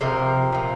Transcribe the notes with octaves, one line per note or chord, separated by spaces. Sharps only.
C3 F3 A#4
A#2 F3